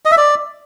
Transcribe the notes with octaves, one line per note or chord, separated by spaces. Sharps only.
D#5
E5
D5